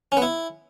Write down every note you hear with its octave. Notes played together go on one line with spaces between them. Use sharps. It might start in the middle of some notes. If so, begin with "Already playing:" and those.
C#4
B3
E4